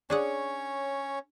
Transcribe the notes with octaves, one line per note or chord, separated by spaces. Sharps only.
C#4 D4 G#4 C#5 F#5